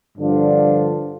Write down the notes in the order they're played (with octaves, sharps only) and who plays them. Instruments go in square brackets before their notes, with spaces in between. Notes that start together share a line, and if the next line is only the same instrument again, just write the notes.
[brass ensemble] G2 D3 F3 D4 F4